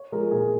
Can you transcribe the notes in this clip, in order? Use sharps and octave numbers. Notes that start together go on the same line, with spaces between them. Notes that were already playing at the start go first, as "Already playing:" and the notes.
Already playing: C#5
F3 G#3 A#4
A#2 G#4